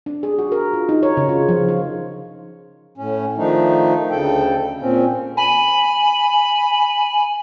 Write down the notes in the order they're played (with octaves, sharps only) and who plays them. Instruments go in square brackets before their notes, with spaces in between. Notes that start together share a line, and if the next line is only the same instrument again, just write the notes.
[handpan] D4
G#4
F#4
A#4
F4
D#4
C#5
C#3
F4
F3
F4
[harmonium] A2 C#4
D#3 F3 A3 D4 D#4
D2 C#3 A4 G5
A#2 C4 C#4
[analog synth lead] G#5 [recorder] B5